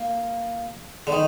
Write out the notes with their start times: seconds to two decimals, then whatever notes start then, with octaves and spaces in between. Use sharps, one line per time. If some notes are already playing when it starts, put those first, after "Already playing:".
Already playing: A#3
1.07 D3
1.12 D#3